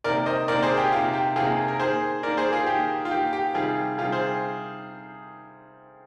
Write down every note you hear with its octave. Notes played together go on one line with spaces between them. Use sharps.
C3 D#3 A#3 A#4 D5
C5 D#5
C3 D#3 A#3 A#4 D5
G#4 C5
G4
C3 D#3 A#3 F4
G4
C3 D#3 A#3 F4 G#4
A#4
D#3 A#3 G#4 C5
D#3 A#3 A#4 D5
G#4 C5
F4 G#4
D#3 A#3 G4
F4
D#3 A#3 G4
G4
C3 D#3 G3 F4 G#4
C3 D#3 G3 F4 G#4
G#4 C5